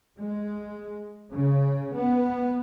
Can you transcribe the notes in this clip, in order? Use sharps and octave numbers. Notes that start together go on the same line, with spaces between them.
G#3
C#3
B3